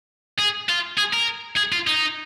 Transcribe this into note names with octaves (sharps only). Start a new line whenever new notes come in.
G#4
F4
G#4
A#4
G#4
F4
D#4